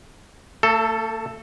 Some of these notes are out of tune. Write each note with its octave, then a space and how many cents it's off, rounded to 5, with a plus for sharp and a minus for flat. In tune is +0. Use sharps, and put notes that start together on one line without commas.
A3 +40 A4 +0